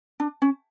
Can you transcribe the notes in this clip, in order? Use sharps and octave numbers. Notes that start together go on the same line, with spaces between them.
D4
C#4